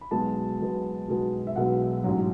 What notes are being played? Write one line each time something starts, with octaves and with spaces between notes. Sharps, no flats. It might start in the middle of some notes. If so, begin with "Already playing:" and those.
B5
B1 B2 G#3 B3 A5
B1 B2 G#3 B3
B1 B2 G#3 B3
E5
B1 B2 G#3 B3 F#5
A1 G#2 F#3